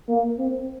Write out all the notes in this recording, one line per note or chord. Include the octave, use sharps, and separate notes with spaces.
A#3
C4